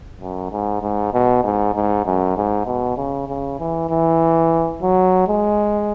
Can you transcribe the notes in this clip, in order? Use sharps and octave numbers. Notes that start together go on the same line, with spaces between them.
F#2
G#2
G#2
B2
G#2
G#2
F#2
G#2
B2
C#3
C#3
E3
E3
F#3
G#3